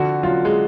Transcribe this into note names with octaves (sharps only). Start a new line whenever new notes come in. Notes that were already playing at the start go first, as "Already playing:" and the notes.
Already playing: D3 F3 F#4
F#3 F4
G#3